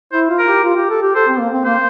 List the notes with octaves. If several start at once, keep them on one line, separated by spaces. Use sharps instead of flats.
E4 C5
F4
A#4
G4
F4
G4
A4
G4
A4 C5
C4
A#3
C4
A#3 C5